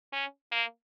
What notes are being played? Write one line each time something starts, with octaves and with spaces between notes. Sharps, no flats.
C#4
A#3